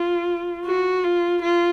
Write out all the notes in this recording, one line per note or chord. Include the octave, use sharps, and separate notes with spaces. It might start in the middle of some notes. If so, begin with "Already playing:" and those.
Already playing: F4
F#4
F4
F4